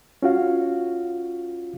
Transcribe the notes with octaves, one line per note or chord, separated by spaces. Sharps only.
C#4 F4 F#4 F5